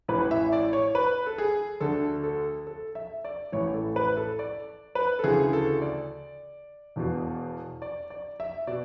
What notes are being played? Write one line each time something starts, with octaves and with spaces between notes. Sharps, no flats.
A1 A2 E3 B4
E5
D5
C#5
B4
A4
G#4
D2 D3 A4
A4
A4
E5
D5
A1 A2 E3 C#5
A4
B4
A4
D5
B4
A4
D2 C#3 E3 G#4
A4
D5
E1 E2 B2
D5
D5
E5
B2 D5